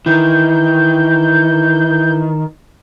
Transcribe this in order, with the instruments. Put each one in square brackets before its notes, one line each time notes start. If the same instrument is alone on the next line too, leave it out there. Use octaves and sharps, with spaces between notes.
[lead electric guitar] D#3 [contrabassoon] E3 [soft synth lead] G6